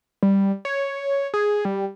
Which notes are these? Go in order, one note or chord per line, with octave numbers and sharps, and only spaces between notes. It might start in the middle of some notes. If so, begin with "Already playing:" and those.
G3
C#5
G#4
G3